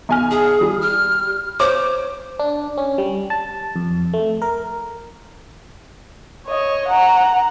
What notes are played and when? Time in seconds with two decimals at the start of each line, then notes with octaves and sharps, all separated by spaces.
0.09 B1 G#5 F6
0.31 G#4
0.61 G3
0.82 F6
1.60 C5 C#5 D6
2.39 D4
2.78 C#4
2.98 G3
3.30 A5
3.76 F2
4.13 A3
4.42 A#4
6.47 C#5 D#5
6.88 F#5 A#5